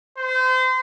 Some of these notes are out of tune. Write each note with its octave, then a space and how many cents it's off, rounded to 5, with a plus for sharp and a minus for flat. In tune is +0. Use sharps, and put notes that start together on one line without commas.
C5 -30